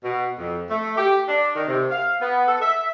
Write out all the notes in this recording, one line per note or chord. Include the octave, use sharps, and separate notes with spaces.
B2
F2
A3
G4
D4
D#3
C3
F5
B3
A4
E5